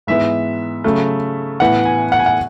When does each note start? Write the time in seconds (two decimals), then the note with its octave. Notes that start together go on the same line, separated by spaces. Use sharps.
0.07 G#2 E3 B3 E5
0.84 C#3 F#3 A3
1.60 A2 E3 B3 F#5
1.85 G#5
2.12 F#5
2.19 G#5
2.26 F#5